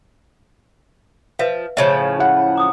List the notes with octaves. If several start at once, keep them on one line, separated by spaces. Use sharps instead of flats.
F3 B4 E5 F5
A2 C#3 F3 E5 A5
E4 F#5
A#5 D6 D#6